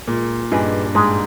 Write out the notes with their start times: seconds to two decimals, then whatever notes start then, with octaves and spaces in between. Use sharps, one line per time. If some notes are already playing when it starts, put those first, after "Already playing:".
0.08 A#2 G#3
0.52 G2 D#4 G#4 B4
0.95 G#2 G#3